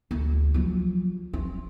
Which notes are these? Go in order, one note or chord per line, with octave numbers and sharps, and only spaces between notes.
D2
F3 F#3
C4